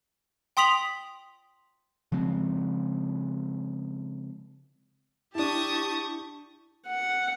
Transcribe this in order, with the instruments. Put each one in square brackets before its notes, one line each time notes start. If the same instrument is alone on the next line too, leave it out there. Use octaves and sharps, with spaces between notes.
[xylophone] G5 C6 D#6 B6 F7 F#7
[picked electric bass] C#3 F3 G#3 C4
[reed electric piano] D4 E4 [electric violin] G4 C#6 [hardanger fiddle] A5 D#6
[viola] F#5